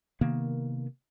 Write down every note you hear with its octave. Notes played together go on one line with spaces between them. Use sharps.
C3 D#3 A#3 B3